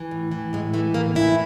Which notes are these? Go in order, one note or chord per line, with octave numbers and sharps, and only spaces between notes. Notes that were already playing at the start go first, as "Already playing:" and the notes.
Already playing: E3
A2
E3
A2 G#3
E3 A3
A2 A#3
E3 E4